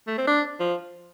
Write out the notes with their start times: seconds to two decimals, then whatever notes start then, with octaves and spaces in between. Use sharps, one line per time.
0.07 A3
0.18 C4
0.27 D4
0.60 F3